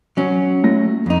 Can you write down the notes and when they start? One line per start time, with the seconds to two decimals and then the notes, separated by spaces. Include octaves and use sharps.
0.17 F#3 C#4
0.63 A3 A#6
1.06 F2 D#4